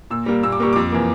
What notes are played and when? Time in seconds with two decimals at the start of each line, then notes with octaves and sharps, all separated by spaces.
0.10 A#2 E6
0.26 G3 A#3
0.43 A#2 E6
0.52 D6
0.60 G3 A#3 C#6
0.73 F2 D6
0.92 E3 A#3